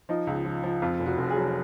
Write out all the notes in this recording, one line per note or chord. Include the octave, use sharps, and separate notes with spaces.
F3 D#4
C#2
F3
F3
F2 F4
F1
F#4
F1
G#4
F#3